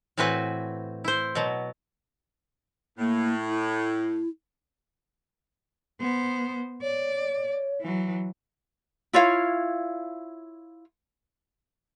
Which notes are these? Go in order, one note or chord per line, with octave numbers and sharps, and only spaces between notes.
A2 E3 C4 F#4 B4 G#5
E4 C5
B2 F#3
A2 A#3
E4
B3 C5
C#5 D5
E3 F#3
E4 F4 C#5 F5